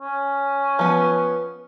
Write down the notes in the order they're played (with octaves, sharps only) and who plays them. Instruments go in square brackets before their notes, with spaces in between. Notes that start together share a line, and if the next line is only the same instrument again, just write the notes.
[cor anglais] C#4
[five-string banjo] F3 B3